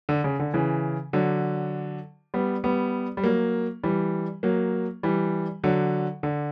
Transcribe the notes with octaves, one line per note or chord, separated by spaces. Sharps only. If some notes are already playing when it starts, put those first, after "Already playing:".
D3
C#3
D3
C#3 E3
D3 F#3
G3 B3
G3 B3
G3
F#3 A#3
E3 G3
F#3 A#3
E3 G3
D3 F#3
D3